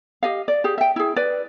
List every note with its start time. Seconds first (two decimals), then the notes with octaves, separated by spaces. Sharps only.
0.23 G4 D#5 F5
0.48 D5
0.64 G4 G#4
0.78 E5 G5
0.96 E4 G#4
1.16 B4 D5